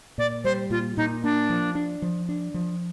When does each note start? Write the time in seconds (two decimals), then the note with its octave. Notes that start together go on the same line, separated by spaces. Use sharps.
0.18 A#2 D5
0.44 G3 C5
0.70 A#2 F4
0.97 A#2 D#4
1.23 A#3 D4
1.49 F3
1.75 D4
2.02 F3
2.29 D4
2.54 F3